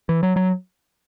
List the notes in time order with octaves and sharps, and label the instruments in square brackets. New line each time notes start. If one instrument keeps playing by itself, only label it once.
[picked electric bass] E3
F#3
F#3